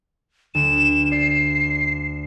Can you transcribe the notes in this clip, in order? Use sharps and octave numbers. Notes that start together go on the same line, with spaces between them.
D2 E7
D5 C7